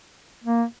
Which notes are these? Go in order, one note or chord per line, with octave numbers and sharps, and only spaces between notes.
A#3